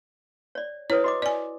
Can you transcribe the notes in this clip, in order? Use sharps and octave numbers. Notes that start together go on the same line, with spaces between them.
C#5 D5
E4 B4 C#5 D#6
F#4 D#5 D6
D5 G#5